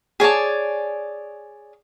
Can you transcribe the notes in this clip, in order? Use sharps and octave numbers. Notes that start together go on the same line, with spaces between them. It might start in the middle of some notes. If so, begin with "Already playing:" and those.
G#4 C#5 D5 A5